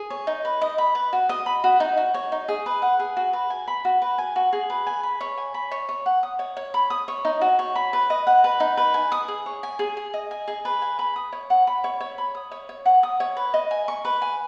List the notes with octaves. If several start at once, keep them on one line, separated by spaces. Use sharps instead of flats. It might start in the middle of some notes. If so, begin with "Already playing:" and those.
Already playing: G#4
C#5
D#4
B4
D#5
B5
B4
F#4
D#5
B5
F#4
D#4
F#4
C#5
D#4
G#4
B4
F#5
G#4
F#4
B4
G#5
B5
F#4
B4
G#5
F#4
G#4
B4
G#5
B5
C#5
G#5
B5
C#5
C#5
F#5
D#6
C#5
C#5
B5
D#6
C#5
D#4
F#4
C#5
B5
B4
D#5
F#5
B4
D#4
B4
G#5
D#6
G#4
C#5
G#5
G#4
G#4
D#5
G#5
G#4
B4
G#5
B5
D#6
C#5
F#5
B5
C#5
C#5
B5
D#6
C#5
C#5
F#5
D#6
C#5
B4
D#5
G#5
C#6
B4
G#5